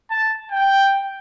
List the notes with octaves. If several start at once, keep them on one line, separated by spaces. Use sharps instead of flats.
A5
G5